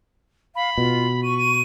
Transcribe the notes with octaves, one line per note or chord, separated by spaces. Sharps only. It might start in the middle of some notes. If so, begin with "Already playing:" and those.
F5 B5
B2 F4
C#6 D#7
D#7